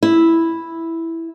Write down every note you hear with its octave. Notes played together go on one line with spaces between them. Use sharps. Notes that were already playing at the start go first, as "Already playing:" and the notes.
E4